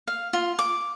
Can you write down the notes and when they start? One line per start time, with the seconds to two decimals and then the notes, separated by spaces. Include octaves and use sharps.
0.08 F5
0.33 F4
0.59 D6